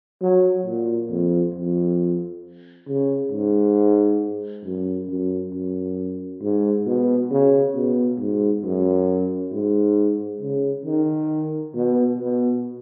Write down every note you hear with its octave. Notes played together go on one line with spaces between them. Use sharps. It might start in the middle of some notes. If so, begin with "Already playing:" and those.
F#3
A#2
F2
F2
C#3
G#2
F#2
F#2
F#2
G#2
B2
C#3
B2
G#2
F#2
G#2
C#3
D#3
B2
B2